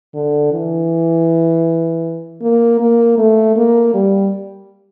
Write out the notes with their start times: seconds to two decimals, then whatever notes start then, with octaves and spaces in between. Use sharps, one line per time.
0.14 D3
0.52 E3
2.42 A#3
2.80 A#3
3.18 A3
3.56 A#3
3.94 G3